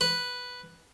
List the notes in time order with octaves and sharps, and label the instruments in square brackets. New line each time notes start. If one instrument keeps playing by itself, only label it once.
[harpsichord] B4